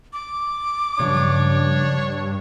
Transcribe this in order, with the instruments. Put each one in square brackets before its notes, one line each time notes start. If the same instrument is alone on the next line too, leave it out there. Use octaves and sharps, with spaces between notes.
[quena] D6
[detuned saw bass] G2 [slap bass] C#3 F3 F#3 [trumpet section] D4 C#5